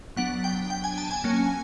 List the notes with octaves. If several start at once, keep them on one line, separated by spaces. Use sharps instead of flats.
F#3 B3 D4 F#5
G5
G5
G#5
A5
G#5
F#3 A#3 C#4